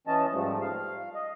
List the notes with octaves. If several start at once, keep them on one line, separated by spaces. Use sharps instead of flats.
E3 C#4 D#5 A5
G#2 F3 G3 A3
F5
D#5